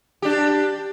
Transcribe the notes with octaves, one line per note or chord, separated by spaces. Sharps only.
D4 G4